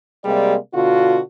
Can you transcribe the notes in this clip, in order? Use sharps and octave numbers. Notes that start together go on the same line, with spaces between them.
C3 G3 G#3 A#3 G#4 D5
B2 D3 F4 F#4